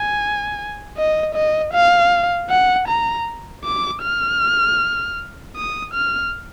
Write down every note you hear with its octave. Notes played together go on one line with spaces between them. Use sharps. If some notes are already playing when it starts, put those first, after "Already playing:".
Already playing: G#5
D#5
D#5
F5
F#5
A#5
D6
F6
D#6
F6